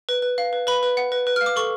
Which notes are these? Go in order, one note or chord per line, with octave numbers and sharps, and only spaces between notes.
B4
B4
F5
B4
B4 B5
B4
F#5
B4
B4
F5 F6
D6
A4 C#6